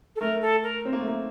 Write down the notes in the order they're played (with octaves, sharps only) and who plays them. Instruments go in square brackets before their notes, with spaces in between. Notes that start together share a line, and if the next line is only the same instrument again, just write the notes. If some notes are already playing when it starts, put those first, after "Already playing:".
[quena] A4
[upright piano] A3 [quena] A#4
[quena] A4
A#4
[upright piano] C4
A#3
A3
A#3